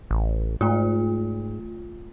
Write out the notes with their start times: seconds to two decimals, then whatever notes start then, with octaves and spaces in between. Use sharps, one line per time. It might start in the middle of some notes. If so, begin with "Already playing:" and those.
0.11 A1
0.61 G#2 A3 F4